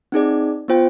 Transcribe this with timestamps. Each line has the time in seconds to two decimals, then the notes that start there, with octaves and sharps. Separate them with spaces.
0.12 C4 D#4 G#4 D5
0.68 B3 F4 C5 G5